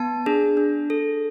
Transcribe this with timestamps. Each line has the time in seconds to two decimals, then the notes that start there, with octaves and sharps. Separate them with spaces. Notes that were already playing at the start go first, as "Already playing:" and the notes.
Already playing: B3 A5
0.26 D4 G#4
0.57 D4
0.90 A4